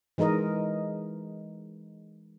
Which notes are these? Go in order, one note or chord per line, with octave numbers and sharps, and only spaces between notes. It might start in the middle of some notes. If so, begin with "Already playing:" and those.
E3 G#3 D#4 A#4 D#5